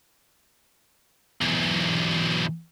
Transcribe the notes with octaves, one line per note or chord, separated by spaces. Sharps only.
B1 E2